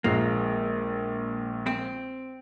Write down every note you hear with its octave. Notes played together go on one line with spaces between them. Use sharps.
A#1 A#2 G#3 A#3
C4